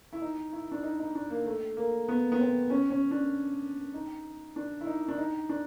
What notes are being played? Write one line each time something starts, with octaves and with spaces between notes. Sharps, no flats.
E4
D#4
E4
D4
D#4
D#4
D4
A#3
A3
A#3
B3
B3
C4
C#4
C#4
D4
D#4
D4
E4
D#4
D4
D#4
D4